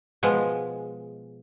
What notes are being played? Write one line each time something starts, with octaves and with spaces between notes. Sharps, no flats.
B2 F3 G#3